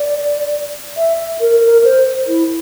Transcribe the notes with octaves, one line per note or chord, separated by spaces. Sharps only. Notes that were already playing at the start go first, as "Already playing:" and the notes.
Already playing: D5
E5
A#4
A#4
C5
E4